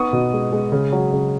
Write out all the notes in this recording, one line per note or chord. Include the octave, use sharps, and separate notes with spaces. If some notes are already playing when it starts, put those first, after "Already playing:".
Already playing: B3 D#4 C#6 D#6
B2
G#3
G#3
C#3
F#3
C#3